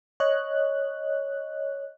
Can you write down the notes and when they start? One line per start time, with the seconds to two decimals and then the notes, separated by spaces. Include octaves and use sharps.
0.20 C#5 D#5 F#6